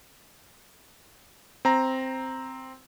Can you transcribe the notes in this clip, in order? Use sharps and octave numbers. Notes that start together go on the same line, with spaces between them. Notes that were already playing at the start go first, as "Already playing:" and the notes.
C4 A#5